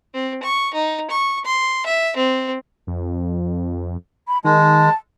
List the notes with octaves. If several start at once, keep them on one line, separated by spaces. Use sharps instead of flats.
C4
C#6
D#4
C#6
C6
E5
C4
F2
B5
D#3 G#3 A5